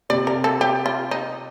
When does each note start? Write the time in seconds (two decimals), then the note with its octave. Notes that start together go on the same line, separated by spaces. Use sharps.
0.10 C3 D5
0.27 A#4
0.44 A4
0.61 G4
0.86 F4
1.11 D#4